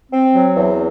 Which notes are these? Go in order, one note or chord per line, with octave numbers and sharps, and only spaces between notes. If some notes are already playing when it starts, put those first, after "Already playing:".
C4
F#3
E2